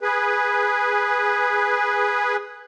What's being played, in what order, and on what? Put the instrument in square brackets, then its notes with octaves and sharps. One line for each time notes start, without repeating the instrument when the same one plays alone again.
[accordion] G#4 B4